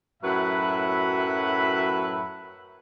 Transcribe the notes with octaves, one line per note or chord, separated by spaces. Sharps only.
F#2 A2 F#3 B4 E5 B5